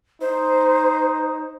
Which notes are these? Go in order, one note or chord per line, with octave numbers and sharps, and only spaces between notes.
D#4 C5